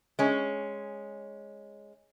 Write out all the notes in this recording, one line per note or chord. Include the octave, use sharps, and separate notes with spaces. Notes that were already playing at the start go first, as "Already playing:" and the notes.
G#3 C#4